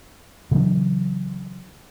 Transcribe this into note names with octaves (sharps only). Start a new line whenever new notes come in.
C#3 E3 F#3 D4